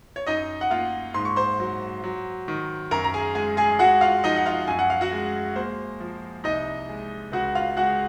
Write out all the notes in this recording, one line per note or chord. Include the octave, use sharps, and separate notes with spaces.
C#5
F#2 D#4 D#5
F#5
A#3 F4 F5
G#2 C6
C#6
C5 C6
F#3
F#3
D#3
F#2 A#4 A#5
A#5
G#4 G#5
G#3 G#4 G#5
G#4 G#5
G#3 F#4 F#5
F4 F5
F3 D#4 D#5
F#5
F4 F5
F#2 G#5
F#5
F5
F#4 F#5
G#3
A#3 C5
F3
C2 D#4 D#5
G#3
C#2 F#4 F#5
F4 F5
G#3 F#4 F#5